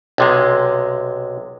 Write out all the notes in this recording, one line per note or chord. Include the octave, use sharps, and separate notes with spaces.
B1 C3 G#3